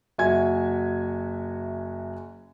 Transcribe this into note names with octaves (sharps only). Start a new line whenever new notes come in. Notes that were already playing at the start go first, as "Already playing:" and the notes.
F#1 F#4 E5 G#5 G#6